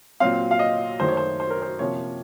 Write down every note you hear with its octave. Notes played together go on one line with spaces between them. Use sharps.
A#2 F#3 C4 F5
F5
D#5
F#2 D#3 A3 C5
C#5
C5
C5
A#4
C5
C3 F3 A#3 C#4 C#5